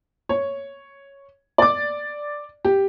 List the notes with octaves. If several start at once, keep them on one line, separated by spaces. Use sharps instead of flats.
C#5
D5 D6
G4